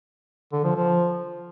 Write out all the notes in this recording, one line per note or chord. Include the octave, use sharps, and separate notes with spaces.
D3
F3
F3